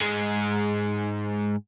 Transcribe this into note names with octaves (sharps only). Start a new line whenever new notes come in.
G#2 G#3